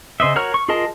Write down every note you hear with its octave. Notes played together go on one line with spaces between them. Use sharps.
C#3 C5 D#5 E5
F#4 A#4 C#5 A#5 F6
C#6
F4 G#4 A#4 D#5 A5